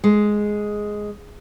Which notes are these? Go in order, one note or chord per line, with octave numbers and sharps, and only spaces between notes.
G#3